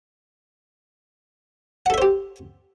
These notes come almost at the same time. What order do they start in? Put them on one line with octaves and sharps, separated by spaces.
F#5 A4 E5 C5 G4